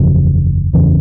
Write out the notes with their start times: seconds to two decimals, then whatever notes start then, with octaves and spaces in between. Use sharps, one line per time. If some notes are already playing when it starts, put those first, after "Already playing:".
Already playing: F#1 E2 C#3 F3
0.73 F#1 E2 C#3 E3